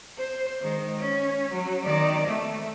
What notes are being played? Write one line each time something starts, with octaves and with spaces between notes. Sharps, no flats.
C5
D#3 G#3
C#4
F#3
D#3 D5
A3